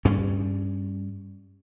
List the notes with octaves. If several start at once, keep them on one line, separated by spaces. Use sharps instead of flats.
G2 G3 C#4